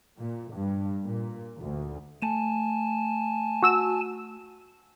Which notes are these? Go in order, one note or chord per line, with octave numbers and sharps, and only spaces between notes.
A#2
G2
A#2
D2
A3 G#5 A5
F#4 E6 E7